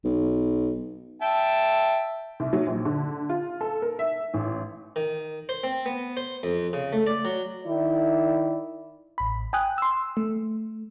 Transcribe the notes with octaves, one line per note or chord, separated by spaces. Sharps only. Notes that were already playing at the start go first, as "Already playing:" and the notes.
B1
E5 G5 A5
C2
F#3
A#1
D3
F4
A4
A#4
E5
A1
D#3
C5
C4
B3
C5
F2
C#3
A3
D5
F#3
D#3 E4 D5
A1 B5
G5 G#5 D#6 F#6
C6 E6
A3